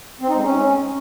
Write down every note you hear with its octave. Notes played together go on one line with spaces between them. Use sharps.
C4
D#4
G#3
C#4